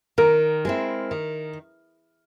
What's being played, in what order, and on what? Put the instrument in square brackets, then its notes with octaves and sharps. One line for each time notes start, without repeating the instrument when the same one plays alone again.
[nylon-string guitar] D#3 [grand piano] A#4
[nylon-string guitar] G#3 C4 E4
D#3